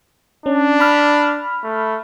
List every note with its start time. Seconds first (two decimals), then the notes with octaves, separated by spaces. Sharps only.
0.46 C#4 D4
0.80 B5 F6
1.63 A3